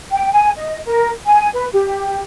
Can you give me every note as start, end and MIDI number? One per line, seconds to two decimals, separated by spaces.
0.11 0.32 79
0.32 0.51 80
0.57 0.79 75
0.86 1.10 70
1.26 1.49 80
1.54 1.68 71
1.73 2.21 67